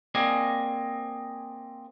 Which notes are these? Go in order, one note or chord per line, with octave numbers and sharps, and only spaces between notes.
A#3 C4 G#4 D5 D#5 G#5